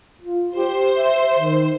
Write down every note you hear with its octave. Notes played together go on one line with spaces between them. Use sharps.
F4
G4 C5
E5
D#3